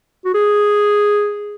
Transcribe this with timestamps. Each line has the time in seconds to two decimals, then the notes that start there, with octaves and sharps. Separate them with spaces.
0.25 F#4
0.34 G#4